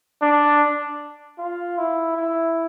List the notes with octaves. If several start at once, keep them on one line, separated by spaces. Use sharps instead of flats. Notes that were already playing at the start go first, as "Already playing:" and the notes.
D4
F4
E4
E4